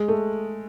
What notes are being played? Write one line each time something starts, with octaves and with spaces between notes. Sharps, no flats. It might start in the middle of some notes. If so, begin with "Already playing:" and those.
Already playing: G#3
A3